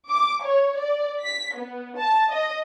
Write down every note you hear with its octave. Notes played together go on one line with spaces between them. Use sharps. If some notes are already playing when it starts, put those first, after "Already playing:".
D6
C#5
D5
B6
B3
A5
D#5